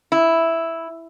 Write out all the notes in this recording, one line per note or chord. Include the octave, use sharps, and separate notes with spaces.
E4